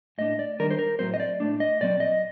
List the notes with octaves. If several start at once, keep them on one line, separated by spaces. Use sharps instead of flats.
A2 A3 D4 D#5
D5
D#3 G3 D4 A#4
C5
A#4
A2 F#3 C4 C5
D#5
D5
A2 A3 D4
D#5
A#2 F#3 C4 D5
D#5